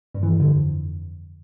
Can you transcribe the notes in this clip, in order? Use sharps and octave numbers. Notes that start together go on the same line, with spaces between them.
G2
E3
F2
D3
F2